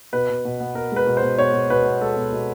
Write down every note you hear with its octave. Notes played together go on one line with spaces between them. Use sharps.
B2 B4
B2
B2
B3
B3 A#4
G#3 B4
B2
C5
B2
B2 C#5
B2
B2 B4
B3
G#3 A4
B2
B2